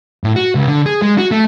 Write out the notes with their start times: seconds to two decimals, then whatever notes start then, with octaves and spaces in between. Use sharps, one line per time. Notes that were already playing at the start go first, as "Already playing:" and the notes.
0.24 A2
0.36 F#4
0.55 C#2
0.68 D3
0.86 G#4
1.02 G#3
1.18 F#4
1.31 A3